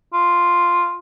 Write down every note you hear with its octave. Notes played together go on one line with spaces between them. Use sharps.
F4